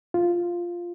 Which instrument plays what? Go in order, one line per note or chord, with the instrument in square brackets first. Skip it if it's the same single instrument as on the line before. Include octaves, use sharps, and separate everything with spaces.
[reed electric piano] F4